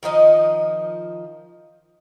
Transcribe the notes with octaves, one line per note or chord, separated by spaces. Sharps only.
D#3 F3 D#4 D#5